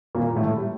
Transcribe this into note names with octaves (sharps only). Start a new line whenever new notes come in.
A#2 A#3
A2 A3
G3